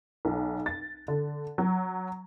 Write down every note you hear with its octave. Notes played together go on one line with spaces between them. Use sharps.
B1
A6
D3
F#3